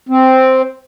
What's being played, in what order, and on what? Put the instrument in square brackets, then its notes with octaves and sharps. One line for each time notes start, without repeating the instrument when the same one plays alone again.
[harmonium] C4